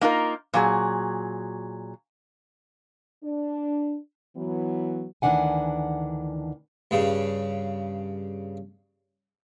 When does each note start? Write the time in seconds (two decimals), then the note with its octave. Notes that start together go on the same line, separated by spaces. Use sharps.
0.01 A#3 D#4 F4 A#4
0.54 A#2 F#3 G#4
3.24 D4
4.37 E3 F#3 B3
5.22 D2 D#3 E3 D4 F#5 G#5
6.91 G2 C#3